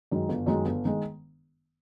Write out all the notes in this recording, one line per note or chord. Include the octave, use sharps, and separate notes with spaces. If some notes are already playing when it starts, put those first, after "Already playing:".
F#2 D#3 G#3
G1
F#2 D#3 G#3
G1
D#3 G#3